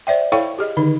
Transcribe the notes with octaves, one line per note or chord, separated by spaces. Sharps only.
C5 D5 E5 G5
E4 A4 C#5 F5 G5 C#6
G4 G#4 D#5
D3 D#3 D#4